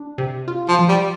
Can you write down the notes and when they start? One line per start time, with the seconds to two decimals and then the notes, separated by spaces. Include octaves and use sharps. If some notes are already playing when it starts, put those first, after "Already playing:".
Already playing: D4
0.18 C3
0.48 F4
0.68 F3
0.79 F3
0.89 G3